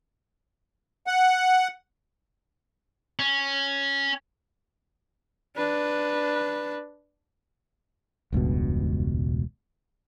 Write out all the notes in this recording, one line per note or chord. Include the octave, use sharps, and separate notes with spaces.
F#5
C#4
D4 B4
E1 C#2 G2 B2